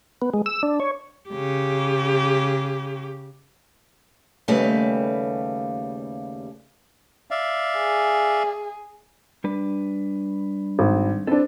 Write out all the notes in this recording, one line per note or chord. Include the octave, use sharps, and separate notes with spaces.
B3
G#3
E6
D4
C#5
C#3 G4
D#2 C#3 G3 A3 B4 F5
D5 E5 F5
G#4
G3 D4 B4
G#1
C4 D4 A4 B4